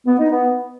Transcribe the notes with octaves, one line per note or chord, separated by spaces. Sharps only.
B3
D#4
B3